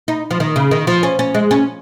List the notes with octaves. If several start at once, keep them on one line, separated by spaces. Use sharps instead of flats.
D#4
F3
D#3
C#3
D#3
F3
C#4
C#4
G#3
C#4